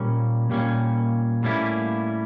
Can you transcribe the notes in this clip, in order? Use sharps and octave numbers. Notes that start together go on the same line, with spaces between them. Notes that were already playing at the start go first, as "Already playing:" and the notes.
Already playing: A#2 G3 A#3 C#4
A#2 G3 A#3 C#4
A2 G3 A#3 C#4 E4